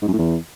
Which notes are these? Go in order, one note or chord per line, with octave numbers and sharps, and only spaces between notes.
G#2
F#2
A2
E2